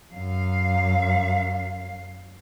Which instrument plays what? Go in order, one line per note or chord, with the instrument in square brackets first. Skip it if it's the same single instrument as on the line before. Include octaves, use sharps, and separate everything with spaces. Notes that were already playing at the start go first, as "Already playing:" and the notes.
[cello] F#2 F5